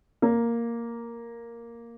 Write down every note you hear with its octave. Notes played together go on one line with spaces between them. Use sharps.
A#3